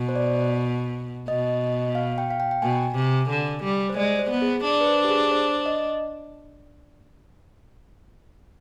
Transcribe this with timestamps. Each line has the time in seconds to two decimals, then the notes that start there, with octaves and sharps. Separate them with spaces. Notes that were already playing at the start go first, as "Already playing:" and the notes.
Already playing: B2
0.09 C5
0.16 D5
1.28 B2 D#5
1.95 F5
2.18 G5
2.30 F5
2.40 G5
2.51 G5
2.62 B2 G#5
2.96 C3
3.30 D3
3.64 G3
3.90 C5
3.97 G#3 D5
4.19 C5
4.31 B3
4.42 G#4
4.64 D4 D5
4.81 B4
4.87 C5
5.04 G4
5.09 G#4
5.31 C5
5.66 D#5